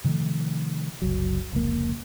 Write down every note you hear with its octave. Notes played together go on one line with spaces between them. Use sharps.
C3 D#3 F3 A3
F#1 C2 F#2 F#3
F1 C#2 A#3